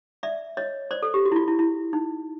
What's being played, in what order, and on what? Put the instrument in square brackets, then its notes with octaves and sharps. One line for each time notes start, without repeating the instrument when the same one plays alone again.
[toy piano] D5 E5
C#5 D#5
C5 D5
A4
G4
F#4
E4
F4
E4
E4
D#4